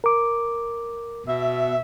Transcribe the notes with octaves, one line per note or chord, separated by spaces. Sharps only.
A#4 D6
B2 E5